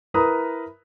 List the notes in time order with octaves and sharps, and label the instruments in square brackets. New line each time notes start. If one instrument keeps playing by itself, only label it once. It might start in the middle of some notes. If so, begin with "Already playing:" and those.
[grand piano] E4 A#4 B4 A#5 D#6